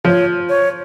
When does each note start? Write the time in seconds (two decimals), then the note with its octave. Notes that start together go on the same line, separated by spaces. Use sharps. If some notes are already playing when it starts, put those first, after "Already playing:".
0.05 F3 C#5
0.49 C#5